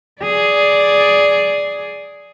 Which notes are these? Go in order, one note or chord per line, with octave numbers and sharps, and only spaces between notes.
G#4 D5